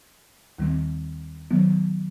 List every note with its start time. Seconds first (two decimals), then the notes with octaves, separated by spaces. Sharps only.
0.58 D#2 D#3 G3 C4
1.51 D#3 F#3 B3